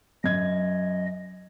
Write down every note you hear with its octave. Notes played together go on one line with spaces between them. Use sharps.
F#2 D#5 G#6